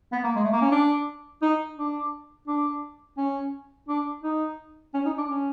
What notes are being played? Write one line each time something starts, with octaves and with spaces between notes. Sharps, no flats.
B3
A#3
G#3
A3
A#3
C#4
D4
D#4
D4
D4
C#4
D4
D#4
C#4
D#4
D4
C#4